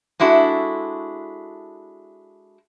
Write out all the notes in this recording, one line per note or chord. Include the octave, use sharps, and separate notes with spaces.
G#3 D4 E4 F#4 A4